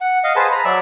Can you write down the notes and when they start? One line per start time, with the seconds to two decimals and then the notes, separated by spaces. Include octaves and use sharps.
0.01 F#5
0.24 D#5 F5
0.36 G#4 B4 C5 A5
0.52 A#5 B5
0.65 F#3 D5 E5 E6